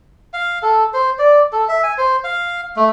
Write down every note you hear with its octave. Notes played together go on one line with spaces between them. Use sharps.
F5
A4
C5
D5
A4
E5
G#5
C5
F5
A3